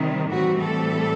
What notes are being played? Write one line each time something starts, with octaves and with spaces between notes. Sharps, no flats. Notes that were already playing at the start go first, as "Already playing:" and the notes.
Already playing: C3 D#3 G3
A2 E3 G3 C4 F#4
A4